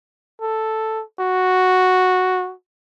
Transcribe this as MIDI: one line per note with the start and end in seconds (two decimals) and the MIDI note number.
0.42 1.03 69
1.20 2.53 66